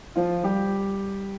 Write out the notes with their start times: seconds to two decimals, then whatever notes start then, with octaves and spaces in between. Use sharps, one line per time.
0.16 F3 F4
0.43 G3 G4